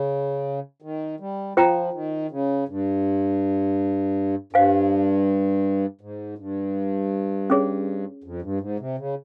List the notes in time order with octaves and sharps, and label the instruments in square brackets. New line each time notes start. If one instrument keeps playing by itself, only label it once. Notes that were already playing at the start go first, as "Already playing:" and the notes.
Already playing: [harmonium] C#3
D#3
G3
[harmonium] F3 [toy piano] F4 C5 G5 A#5
[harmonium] D#3
C#3
G2
[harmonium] G2 [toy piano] C5 F5 G#5
[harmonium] G#2
G2
[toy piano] C#4 G#4 C#5
[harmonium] F2
G2
G#2
C3
C#3